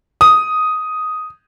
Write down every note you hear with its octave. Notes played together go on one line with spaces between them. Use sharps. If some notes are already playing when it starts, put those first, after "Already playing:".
D#6